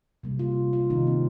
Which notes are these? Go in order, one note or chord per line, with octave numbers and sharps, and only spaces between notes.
C3 G3 A#3
F4
F4
C3 D#3 A#3 D#4
C4